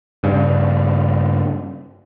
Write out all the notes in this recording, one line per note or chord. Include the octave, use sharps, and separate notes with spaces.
G2 C#3